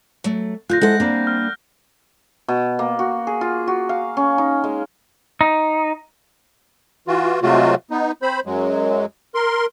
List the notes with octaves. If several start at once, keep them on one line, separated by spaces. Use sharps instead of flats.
F#3 A3
D3 A3 F4 F#6 G6 A#6
G#3 E4 A4 C5 F#5
G3 A#3 C4 D4
F6
B2
A#3
F#4
G#4
F4
F#4
F5
C#4
D#4
G#3
D#4
E3 F4 F#4
C3 F#3 G#3 A3 F4 F#4
B3 D#4
C4 C5 B5
F#2 F#3 G#3
A#4 C6